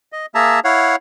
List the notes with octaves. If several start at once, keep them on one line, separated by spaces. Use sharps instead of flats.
D#5
A#3 G#4 E5 A5 A#5
E4 C#5 F5 F#5